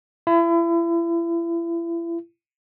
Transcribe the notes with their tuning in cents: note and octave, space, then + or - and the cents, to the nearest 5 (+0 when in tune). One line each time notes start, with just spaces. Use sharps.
E4 +35